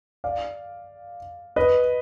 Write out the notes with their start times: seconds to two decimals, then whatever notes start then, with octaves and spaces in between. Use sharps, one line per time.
0.24 D5 F5
1.56 B4 D#5